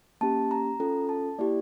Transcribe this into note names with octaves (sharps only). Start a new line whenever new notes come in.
A#3 C#4 G4 A5
A#5
C#4 F4 A4
A5
A#3 E4 G4 D5